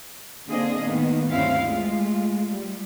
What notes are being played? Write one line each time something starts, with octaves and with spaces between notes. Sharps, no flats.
D3 A#3 C4 D4 G#4 D#5
A2 D#3 A#3 B3
D2 G2 C4 C#4 E4 F5
G#3 A3 F4
G3